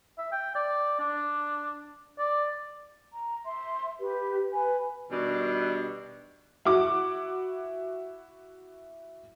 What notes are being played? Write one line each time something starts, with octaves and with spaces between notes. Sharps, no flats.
E5
G5
D5
D4
D5
A#5
E5 C6
G4 B4
B4 G#5
B2 D#3 G3 D4
E4 F#4 D6